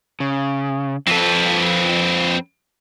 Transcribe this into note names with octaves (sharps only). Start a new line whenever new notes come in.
C#3
F2 C4 A4 B4